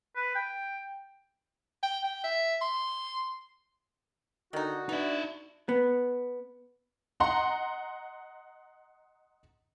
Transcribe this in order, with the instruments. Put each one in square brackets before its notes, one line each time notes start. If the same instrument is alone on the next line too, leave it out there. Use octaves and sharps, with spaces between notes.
[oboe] B4
G5
[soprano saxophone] G5
G5
E5
C6
[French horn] D3 [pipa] D#3 D#4 [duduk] F#4
[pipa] B3 [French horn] D4 [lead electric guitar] D#4 E5
[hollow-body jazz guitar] B3
[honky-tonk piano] D#5 F#5 A#5 C6